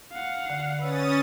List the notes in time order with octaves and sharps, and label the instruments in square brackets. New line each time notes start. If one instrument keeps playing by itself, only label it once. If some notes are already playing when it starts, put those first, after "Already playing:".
[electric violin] F5 F#5
[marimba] D3
[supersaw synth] C#4 D#6 A6 [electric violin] B4 [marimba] C#5 E6